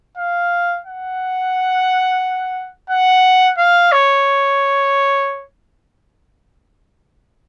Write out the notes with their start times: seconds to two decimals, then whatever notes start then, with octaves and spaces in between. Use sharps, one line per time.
0.18 F5
0.86 F#5
2.90 F#5
3.58 F5
3.92 C#5